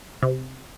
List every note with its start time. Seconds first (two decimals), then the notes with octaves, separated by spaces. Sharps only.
0.23 C3